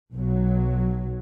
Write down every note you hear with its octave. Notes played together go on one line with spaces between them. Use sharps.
B1 F#3